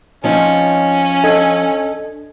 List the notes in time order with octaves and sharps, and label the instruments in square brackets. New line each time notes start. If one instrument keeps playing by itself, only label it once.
[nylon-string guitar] F3 C4 D#4 [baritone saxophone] C#4 [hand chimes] C#5 D#5
[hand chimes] D4 G#6 [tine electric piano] A4 D#5